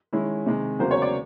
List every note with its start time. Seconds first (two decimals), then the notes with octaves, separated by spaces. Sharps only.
0.13 D#3 G#3 C#4 E4
0.46 C3 D#3 G#3
0.79 E2 C#3 F#3 A#3 C5
0.91 C#5
1.02 D5